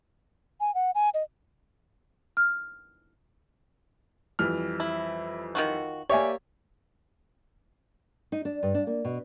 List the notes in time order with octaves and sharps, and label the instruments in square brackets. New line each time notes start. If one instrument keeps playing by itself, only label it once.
[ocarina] G#5
F#5
G#5
D#5
[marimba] F6
[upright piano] F2 E3 G3 [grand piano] F6
[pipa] E4
D#3 F4 F#4
[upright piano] A#3 G4 [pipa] C#5 [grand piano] D5 E5 G#5
[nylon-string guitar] D#4
D4
G2
D4
A#3
B2